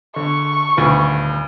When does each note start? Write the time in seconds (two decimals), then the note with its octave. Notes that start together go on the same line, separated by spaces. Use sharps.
0.16 D3 C#6
0.77 D#1 D2 B4